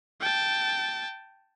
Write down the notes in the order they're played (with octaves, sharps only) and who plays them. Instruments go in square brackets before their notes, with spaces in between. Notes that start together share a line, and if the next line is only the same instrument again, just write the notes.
[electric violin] G5 A5